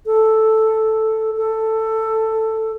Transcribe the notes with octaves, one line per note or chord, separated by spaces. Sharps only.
A4
A4